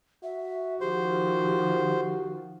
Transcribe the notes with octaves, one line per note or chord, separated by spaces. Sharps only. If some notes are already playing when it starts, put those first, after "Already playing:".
F#4 E5
D#3 F3 G4 C5